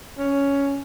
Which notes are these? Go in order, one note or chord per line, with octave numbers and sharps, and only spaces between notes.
C#4